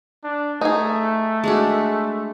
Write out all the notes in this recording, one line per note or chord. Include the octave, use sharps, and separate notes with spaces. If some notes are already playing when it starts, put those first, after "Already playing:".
D4
A3 D#4 G#4
G#3 D4 F#4